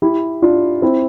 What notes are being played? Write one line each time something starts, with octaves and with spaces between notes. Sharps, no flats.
E4 G4
D4 F4
C4 E4